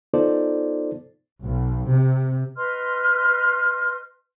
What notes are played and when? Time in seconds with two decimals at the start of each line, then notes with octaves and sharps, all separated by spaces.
0.14 B3 D#4 F4 A4 C5 D5
1.45 B1
1.88 C3
2.57 B4 D#5 C6 F6